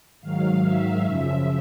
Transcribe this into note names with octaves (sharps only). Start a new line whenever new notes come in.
G#2 D#3 F#3 F5
E5
F#2 C#3 F3 E5